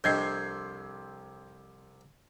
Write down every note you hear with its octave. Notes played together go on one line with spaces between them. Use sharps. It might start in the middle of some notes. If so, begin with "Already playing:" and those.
C2 F2 C3 D4 D#5 G6 G#6 C7